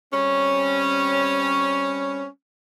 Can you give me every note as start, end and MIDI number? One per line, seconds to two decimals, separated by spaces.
0.13 2.27 55
0.13 2.27 60
0.13 2.27 61